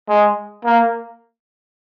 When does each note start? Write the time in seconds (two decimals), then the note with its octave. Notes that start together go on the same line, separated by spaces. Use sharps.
0.09 G#3
0.65 A#3